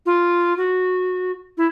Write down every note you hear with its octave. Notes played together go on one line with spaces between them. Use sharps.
F4
F#4
E4